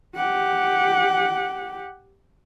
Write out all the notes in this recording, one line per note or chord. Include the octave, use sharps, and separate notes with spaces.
G4 F#5